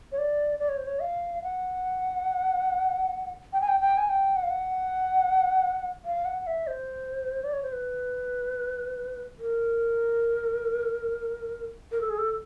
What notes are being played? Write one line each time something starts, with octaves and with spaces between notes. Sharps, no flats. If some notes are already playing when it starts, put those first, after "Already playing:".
C#5
D5
D5
C#5
C5
C#5
F5
F#5
G5
G#5
G5
G5
G#5
G5
F#5
F5
F#5
F5
F#5
E5
C5
D5
C#5
C5
B4
A#4
A#4
A4
G#4
A4